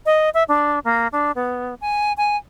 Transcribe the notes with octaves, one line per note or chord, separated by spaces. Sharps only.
D#5
E5
D4
A#3
D4
B3
G#5
G#5